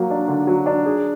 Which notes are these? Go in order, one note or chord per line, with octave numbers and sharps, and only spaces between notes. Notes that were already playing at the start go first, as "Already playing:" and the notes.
Already playing: F#3 A#3
D4
D3
F#3
D4
G#4